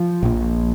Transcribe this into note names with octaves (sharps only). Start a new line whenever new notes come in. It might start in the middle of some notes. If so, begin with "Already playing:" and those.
Already playing: F3
A#1 A#2